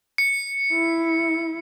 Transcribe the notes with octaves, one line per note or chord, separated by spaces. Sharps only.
C#7
E4